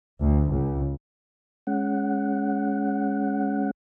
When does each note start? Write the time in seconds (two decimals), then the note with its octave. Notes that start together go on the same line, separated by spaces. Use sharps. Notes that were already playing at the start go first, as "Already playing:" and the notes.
0.22 D2
0.53 C#2
1.67 G#3 C#4 F#5